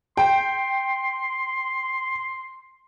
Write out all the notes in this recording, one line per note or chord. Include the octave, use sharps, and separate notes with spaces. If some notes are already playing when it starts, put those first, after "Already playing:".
G5 C6